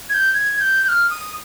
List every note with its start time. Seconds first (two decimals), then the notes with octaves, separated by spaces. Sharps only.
0.09 G#6
0.14 G6
0.34 G#6
0.60 G6
0.84 G6
0.89 F6
1.10 D#6